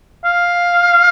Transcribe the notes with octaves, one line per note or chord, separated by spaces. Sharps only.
F5